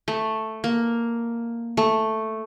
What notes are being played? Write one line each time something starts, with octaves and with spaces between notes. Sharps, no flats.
A3
A#3
A3